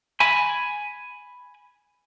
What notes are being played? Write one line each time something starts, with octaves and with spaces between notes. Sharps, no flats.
G#5 B5